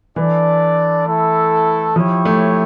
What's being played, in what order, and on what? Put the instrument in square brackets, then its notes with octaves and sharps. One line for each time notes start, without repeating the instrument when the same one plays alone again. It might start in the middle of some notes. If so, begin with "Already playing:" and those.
[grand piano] E3 [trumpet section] D4 A4 D5
[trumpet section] A3 E4 A4
[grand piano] F3 [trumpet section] E4 G4 C#5
[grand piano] A3